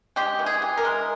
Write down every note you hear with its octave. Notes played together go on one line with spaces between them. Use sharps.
G#3 G4
E3
G#4
E3
A#4
G#3